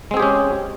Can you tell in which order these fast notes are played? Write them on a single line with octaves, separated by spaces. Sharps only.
G#3 C4 G#4 G4 C#4